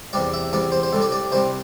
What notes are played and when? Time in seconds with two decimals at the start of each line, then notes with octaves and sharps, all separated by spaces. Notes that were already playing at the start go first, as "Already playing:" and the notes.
0.13 E2 C3 G3 D5
0.34 E5
0.53 E2 C3 G3 D5
0.72 C5
0.83 C5
0.92 C2 C3 G3 A4
1.02 D5
1.12 D5
1.32 C2 C3 G3 C5